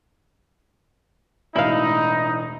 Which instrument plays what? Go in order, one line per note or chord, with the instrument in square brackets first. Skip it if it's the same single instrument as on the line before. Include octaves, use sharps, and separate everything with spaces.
[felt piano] E1 A2 [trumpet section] D#4 [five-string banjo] E4 F5